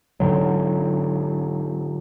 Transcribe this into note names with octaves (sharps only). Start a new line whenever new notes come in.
G#2 D3 F#3